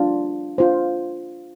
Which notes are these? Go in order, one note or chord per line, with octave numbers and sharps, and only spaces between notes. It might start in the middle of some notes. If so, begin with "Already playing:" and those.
Already playing: D4 F4
D4 F4 C5